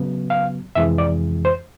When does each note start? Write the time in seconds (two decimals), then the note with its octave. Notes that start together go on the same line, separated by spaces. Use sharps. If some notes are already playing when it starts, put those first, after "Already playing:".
Already playing: C#3 F#3 B3
0.30 F5
0.75 F2 C3 E3 G#3 E5
0.98 D5
1.45 C5